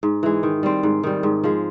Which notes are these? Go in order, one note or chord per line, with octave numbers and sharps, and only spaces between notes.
G#2
E3 G#3
D#3
G3 C4
G#2
D#3 G3
G#2
F3 G#3